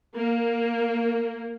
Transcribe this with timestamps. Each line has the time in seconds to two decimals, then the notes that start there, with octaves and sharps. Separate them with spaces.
0.14 A#3